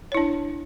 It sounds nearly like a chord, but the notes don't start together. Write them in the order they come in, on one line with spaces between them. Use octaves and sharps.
C#5 E4 D4